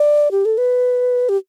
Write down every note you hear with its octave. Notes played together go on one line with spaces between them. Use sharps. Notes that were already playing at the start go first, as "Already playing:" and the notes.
Already playing: D5
G4
A4
B4
G4